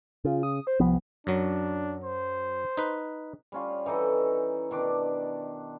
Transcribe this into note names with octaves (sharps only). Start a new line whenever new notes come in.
C#3 F4
D#6
C5
C2 F3 B3
F#2 F#3 D4
C5
D#4 B4
G3 C#4 F4
E3 D#4 A4 D#5
B2 D#3 D4 D6